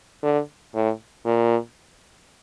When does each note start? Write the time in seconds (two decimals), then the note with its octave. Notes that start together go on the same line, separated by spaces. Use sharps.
0.23 D3
0.75 A2
1.26 A#2